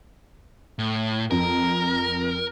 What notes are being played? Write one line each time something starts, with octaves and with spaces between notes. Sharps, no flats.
A2
F2 A#4